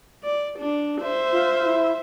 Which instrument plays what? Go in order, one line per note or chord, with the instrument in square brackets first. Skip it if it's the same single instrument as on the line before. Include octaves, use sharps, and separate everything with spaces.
[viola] D5
D4
C5 E5
[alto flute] F4
E4